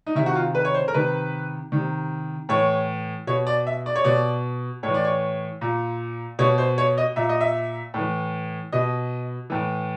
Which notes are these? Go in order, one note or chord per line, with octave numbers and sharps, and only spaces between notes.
D#4
C3 D#3 E4
F#4
F4
B4
C#5
C5
A#4
C3 D#3 B4
C3 D#3
A2 E3 C#5
B2 C#5
D5
E5
D5
C#5
B2 D5
A2 E3 C#5
D5
C#5
A#2
B2 C#5
C5
C#5
D#5
A#2 E5
D#5
E5
A2 E3
B2 D#5
A2 E3